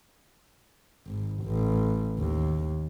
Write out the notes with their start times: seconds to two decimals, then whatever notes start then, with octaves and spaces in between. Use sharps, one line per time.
1.06 G#1
1.43 A1
2.20 D#2